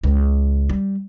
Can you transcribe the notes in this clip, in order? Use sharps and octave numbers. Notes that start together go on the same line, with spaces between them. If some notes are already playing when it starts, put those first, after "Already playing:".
C#2
G3